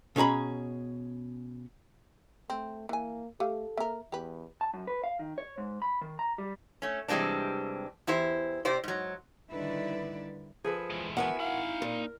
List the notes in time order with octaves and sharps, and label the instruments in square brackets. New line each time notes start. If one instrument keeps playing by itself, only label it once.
[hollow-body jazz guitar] B2 C#4 G#4 A#5 B5
[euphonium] A3 [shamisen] C4
[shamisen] E3 G#5 [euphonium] A#3
[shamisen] A3 [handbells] G4 F5 [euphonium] A4
[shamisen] A#3 A#4 [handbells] E5
[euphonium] E2 [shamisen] G4 B4
[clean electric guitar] A5
F#2
B4
F5
D#3
C#5
G#2
B5
D#3
A#5
G3
[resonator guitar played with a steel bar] A3 C#4
C3 E3 G3 G#3 C4 D4
E2 E4 G4 C5
C3 G4 C5 D5
G#2 F#3
[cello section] D3 D#3 G3 E4 B4 D5
[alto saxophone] F3 [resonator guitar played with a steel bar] G#4 A4 B4
[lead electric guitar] E3 G#3
[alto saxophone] B3 [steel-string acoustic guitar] E4 E5 G#5 [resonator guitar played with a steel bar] F#4 A#4 F#5
[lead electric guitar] D#4 B5 [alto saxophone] F5
[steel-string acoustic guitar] A#2 [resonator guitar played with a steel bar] A#4